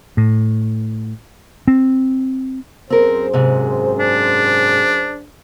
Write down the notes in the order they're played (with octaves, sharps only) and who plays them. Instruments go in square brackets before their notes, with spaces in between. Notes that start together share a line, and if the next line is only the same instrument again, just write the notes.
[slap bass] A2
C4
[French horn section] F#2 G#4 C5 [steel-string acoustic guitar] C4 A#4
[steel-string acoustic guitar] G#2 C3
[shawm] D4